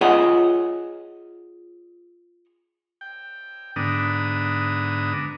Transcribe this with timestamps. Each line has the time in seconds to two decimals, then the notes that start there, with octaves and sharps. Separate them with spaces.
0.01 F4 G#4 C#5 D#5 E5 F#5
3.01 G5
3.76 G#2 D3 B3 D4 A#5 D#6